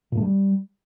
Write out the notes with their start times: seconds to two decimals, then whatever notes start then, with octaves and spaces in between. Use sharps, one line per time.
0.12 A#2
0.17 A3
0.23 G3